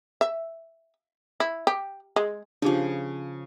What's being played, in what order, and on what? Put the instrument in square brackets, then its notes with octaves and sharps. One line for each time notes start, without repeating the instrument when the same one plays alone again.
[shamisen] E5
E4
G4
G#3
[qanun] C#3 F3 [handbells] D4 G4